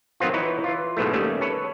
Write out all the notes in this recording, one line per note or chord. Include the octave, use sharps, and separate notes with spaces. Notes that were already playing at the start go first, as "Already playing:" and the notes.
D#3 F#3 B3 C4 F4
E3 D#4 E4 B4 C#5
E3 F4
G#2 B2 F#3 A3
D#2 D#3 G3 A3 C#4
A4 B4 C#5